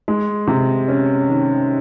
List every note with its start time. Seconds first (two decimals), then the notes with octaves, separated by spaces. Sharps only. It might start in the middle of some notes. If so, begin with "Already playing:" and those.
0.08 G#3
0.47 C3
0.88 C#4
1.28 D#3